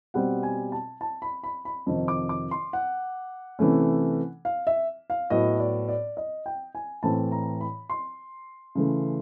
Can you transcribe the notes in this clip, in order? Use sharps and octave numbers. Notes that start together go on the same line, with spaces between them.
B2 G3 C4 F#5
G#5
A5
A5
B5
B5
B5
F2 C3 D#3
D6
D6
C6
F#5
C3 E3 A3 C#4
F5
E5
F5
A2 F#3 B3 D#5
D5
D5
D#5
G5
G#5
A2 E3 A3 C4 A5
A#5
B5
C6
C#3 E3 A3